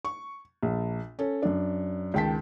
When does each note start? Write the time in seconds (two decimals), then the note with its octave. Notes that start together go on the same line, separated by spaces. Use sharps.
0.05 C#6
0.63 A#1
1.19 C#4 A4
1.43 F#2 D4
2.14 C#2 D#3 G5 A5 B6